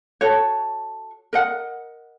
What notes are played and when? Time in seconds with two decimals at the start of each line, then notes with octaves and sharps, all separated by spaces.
0.21 F#4 A4 C#5
1.33 A#4 D#5 F#5